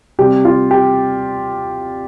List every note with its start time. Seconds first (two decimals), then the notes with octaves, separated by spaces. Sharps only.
0.19 C3 G3 G4
0.45 F4
0.71 G4